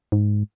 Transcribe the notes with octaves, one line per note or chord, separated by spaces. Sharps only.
G#2